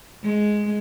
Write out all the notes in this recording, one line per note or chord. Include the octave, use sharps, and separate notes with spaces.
G#3